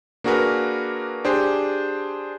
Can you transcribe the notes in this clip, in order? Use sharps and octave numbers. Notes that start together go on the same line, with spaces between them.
A#3 D4 F#4 G#4 A#4 B4
D4 G4 G#4 C5